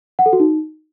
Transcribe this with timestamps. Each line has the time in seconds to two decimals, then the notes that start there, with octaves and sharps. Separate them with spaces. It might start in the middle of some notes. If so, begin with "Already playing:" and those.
0.19 F#5
0.26 A4
0.33 F#4
0.40 D#4